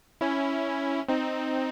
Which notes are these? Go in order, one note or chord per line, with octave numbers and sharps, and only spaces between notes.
C#4 E4
C4 D#4